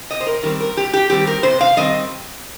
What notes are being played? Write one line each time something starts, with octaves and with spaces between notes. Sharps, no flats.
C3 D#5
C5
A#4
D#3 G3 C4 A#4
A#4
C3 G4
G4
D#3 G3 C4 G4
A#4
C3 C5
F5
D#3 G3 C4 D#5